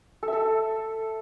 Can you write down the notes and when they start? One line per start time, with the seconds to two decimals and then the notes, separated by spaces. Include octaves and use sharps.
0.23 A4
0.28 E5
0.33 A4